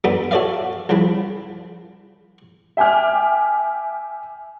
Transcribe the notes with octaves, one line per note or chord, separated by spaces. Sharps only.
F#2 B3 D4 D#4 A4 B5
F#4 A4 C#5 D5 E5 F5
C2 C#3 F3 B5
E5 G5 G#5 D6 F6